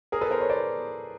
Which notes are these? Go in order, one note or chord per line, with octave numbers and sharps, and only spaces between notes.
G#4 A#4
A4 B4
A#4 C5
B4 C#5
C5 D5